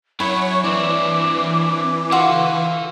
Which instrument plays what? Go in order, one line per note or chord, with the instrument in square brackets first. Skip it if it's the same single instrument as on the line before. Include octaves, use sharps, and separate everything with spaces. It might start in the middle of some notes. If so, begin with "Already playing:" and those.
[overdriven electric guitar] F#2 F#3 [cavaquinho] E4 [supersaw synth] C#5 [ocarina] C#6
[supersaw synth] E3 [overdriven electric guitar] C4 D4 [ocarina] D6
[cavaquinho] F4 F#4 F5 [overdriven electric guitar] A4 F#5